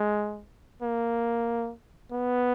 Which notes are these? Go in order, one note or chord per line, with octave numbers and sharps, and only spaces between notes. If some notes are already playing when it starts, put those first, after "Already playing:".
Already playing: G#3
A#3
B3